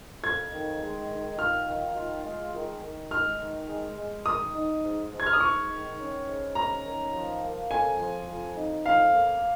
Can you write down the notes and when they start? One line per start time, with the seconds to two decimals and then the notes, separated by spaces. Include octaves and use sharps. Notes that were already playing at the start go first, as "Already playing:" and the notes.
0.23 F2 G#6
0.52 D#3
0.81 G#3
1.10 D#3
1.38 F4 F6
1.67 D#3
1.96 F4
2.25 G#3
2.54 D#3
2.82 D#3
3.10 G#3 F6
3.40 D#3
3.68 G#3
3.97 G#3
4.26 D#3 D#6
4.55 D#4
4.83 G#2
5.12 G#2
5.20 G#6
5.26 F6
5.33 D#6
5.40 G#2 C#6
5.69 D#3
5.99 C#4
6.27 G#2
6.55 C#4 A#5
6.84 D#3
7.13 F3
7.42 A#3
7.70 F2 G#5
7.99 F3
8.28 F2
8.56 D#4
8.85 F2 F5
9.13 A#3